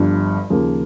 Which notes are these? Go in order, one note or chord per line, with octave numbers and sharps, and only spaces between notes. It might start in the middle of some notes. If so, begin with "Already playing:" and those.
Already playing: G1 G2 F3
D#2 C#3 F3 A#3